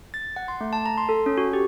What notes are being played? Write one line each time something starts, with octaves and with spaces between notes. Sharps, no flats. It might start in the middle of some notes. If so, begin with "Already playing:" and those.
A6
F#5
C6
A3
A5
A#5
C6
A4
C#4
F#4
G4